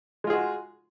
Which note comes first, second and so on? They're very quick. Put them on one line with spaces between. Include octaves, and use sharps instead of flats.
G#3 F4 G#4 F#4